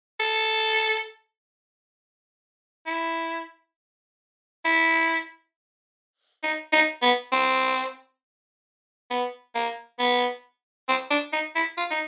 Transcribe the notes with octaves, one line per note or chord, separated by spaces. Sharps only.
A4
E4
E4
D#4
D#4
B3
C4
B3
A#3
B3
C4
D4
D#4
E4
F4
D#4